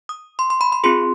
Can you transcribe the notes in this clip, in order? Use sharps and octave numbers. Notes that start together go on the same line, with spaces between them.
D#6
C6
C6
B5
C6
C4 F4 G#4 C6